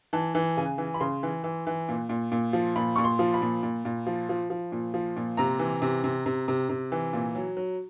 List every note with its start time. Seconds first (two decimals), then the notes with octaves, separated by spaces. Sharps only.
0.13 E3 A5
0.35 E3
0.57 C#3 G#5
0.78 E3
0.94 B5
1.00 C#3 C6
1.23 E3
1.44 E3
1.67 E3
1.89 A#2
2.09 A#2
2.32 A#2
2.53 F3
2.76 A#2 B5
2.96 A#2 C#6
3.04 C6
3.19 F3
3.34 B5
3.42 A#2
3.63 A#2
3.85 A#2
4.07 F3
4.29 F3
4.50 F3
4.72 A#2
4.94 F3
5.16 A#2
5.37 C3 A#5
5.59 E3
5.82 C3
6.04 C3
6.26 C3
6.48 C3
6.69 C3
6.92 E3
7.13 A#2
7.35 F#3
7.57 F#3